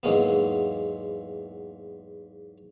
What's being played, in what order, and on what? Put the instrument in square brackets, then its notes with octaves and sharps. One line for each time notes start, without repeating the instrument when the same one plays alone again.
[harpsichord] E2 G#2 F#3 G#3 A#3 B3